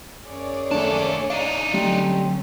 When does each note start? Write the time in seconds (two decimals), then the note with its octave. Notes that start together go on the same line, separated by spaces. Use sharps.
0.25 F#2 G#4 C#5 D5
0.71 D#2 A3 D4 A4
1.30 D4 D#4 F5
1.74 D3 F#3 G3 A3 C4 C#4